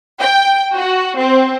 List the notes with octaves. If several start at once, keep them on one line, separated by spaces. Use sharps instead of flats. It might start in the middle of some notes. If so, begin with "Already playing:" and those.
G5
F#4
C4